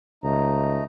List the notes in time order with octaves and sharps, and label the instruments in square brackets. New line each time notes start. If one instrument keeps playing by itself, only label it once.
[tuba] C#2 [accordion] A3 D#4 A#5